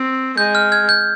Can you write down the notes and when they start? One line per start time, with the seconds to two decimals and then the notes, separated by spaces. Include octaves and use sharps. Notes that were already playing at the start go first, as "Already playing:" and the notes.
Already playing: C4
0.37 G#3 G6
0.55 F6
0.72 F6 G#6
0.89 G6